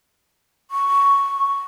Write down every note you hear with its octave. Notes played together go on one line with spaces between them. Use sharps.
C#6